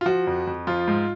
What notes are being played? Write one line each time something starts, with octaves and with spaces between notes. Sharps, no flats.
F4
F3 F#4
F2
F2
F3 F4
G#2